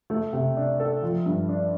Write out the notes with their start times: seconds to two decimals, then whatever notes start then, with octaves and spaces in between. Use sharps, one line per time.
0.10 A3
0.33 C3
0.57 D4
0.80 A4
1.02 F3
1.26 G2
1.49 D4